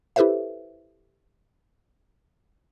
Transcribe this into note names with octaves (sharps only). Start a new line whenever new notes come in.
E4 G4 A4 B4 C5 E5